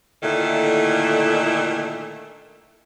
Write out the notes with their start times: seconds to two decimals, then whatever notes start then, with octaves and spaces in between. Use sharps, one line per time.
0.22 A#2 D3 D#3 A3 E4